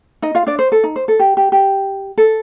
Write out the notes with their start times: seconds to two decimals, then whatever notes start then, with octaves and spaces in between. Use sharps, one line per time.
0.22 D#4 D#5
0.35 F4 F5
0.47 D4 D5
0.59 C5
0.72 A4
0.84 D#4
0.96 C5
1.08 A4
1.19 G4
1.37 G4
1.52 G4
2.18 A4